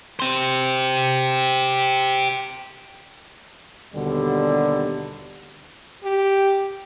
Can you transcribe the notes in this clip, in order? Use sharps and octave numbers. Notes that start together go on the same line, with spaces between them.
G4 C5
D#2 B2 D3 G3
G4